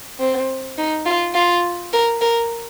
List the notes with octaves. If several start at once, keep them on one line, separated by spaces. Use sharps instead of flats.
C4
D#4
F4
F4
A#4
A#4